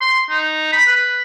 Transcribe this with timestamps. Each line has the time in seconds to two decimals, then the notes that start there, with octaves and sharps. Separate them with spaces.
0.01 C6
0.30 D#4
0.72 B5
0.86 B4